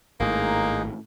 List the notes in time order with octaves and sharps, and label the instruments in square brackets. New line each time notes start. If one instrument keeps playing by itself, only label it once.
[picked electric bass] G#1 A2 [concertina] G#3 D#4 G#4 [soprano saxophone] A#3